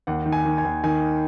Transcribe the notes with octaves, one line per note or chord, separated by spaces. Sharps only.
D#2 F#5
D#3
G#5
D#3
G#5
D#2
D#3 G#5